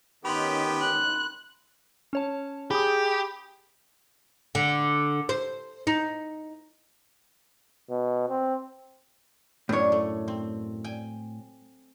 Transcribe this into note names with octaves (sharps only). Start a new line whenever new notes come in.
D#3 B3 C#4 G4 B5 C6
F#6
C#4 C#5 A5
G4 G#4 B5 D#6
D3
C5
D#4
B2
C4
F#2 A2 D4 C#5
A3
C4
G5 G#5